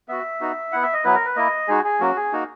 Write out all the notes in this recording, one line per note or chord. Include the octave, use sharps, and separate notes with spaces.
B3 F#4 E5
B3 D#4 F#4
B3 E4 F#5
E5
D#5
F#3 B3 E4 B4
A#4
B4
A#3 E4 D#5
G#3 D#4 F#4 G#4
G#4
F#3 A#3 C#4 F#4
G#4
A#3 D#4 F#4